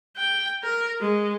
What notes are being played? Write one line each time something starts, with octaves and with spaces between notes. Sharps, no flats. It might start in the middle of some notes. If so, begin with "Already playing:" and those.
G5
A#4
G#3